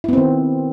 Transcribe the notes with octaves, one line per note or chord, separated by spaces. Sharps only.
D#3 B3 C4 E4